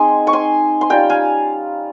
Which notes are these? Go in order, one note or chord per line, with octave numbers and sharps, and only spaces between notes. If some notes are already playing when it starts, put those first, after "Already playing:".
Already playing: G#3 C4 D#4 G#5 C6
C#6
G#5 C6
C6
G3 C#4 F4 G5 A#5
F5 G#5